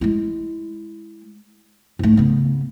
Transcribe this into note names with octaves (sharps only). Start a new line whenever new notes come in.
G#3 E4
G#2 A3
C#3 B3